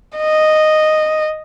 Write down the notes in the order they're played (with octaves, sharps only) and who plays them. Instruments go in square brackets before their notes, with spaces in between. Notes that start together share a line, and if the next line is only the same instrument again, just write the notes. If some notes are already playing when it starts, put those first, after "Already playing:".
[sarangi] D#5